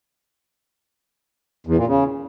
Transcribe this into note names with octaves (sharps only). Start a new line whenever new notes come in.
E2
A#2
C#3